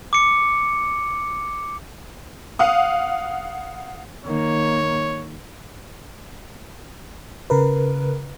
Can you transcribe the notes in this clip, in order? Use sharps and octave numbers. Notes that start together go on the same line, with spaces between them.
D6 C#7
F5 F#5 D#6
D#3 A#3 C#5
C#3 A#4 B4